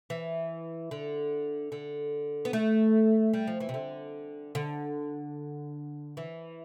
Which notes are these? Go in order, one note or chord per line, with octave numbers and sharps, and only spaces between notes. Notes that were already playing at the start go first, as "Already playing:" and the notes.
E3
D3
D3
B3
A3
G3
F3
E3
C3
D3
D3
E3